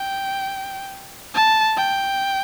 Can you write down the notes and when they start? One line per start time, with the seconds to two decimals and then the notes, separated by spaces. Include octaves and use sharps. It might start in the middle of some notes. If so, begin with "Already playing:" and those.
Already playing: G5
1.35 A5
1.77 G5